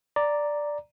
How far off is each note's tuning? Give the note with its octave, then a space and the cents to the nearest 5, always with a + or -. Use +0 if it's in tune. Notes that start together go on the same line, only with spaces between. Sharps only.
D5 +0 A#5 +0